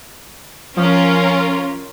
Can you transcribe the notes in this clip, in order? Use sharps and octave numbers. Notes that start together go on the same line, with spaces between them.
F3 C#4 F4 A#4